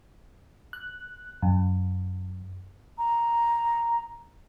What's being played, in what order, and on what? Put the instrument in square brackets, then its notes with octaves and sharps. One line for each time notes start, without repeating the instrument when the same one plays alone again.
[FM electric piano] F#6
F#2
[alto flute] A#5